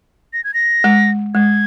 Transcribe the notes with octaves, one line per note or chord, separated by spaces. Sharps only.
A#6
G#6
A#6
G#3
G#3 G#6